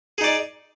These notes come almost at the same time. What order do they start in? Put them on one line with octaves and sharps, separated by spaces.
G#4 D#4 D5